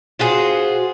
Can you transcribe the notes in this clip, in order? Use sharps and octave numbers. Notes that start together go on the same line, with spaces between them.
F4 F#4 G#4 C5